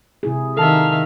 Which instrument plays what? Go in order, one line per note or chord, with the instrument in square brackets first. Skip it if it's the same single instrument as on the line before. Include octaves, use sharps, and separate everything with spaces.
[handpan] C3 E4 G#4
[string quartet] D#3 [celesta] A4 A5 [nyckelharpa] E5 F5